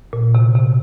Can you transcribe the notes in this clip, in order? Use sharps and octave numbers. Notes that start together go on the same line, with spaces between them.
A#2
C3
C3